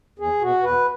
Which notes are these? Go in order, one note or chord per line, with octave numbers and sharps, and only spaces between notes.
E2 G#4
B2 F#4
E2 B4